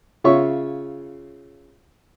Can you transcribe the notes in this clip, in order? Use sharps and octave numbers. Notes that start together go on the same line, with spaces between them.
C#3 F4 C#5 E5 C#6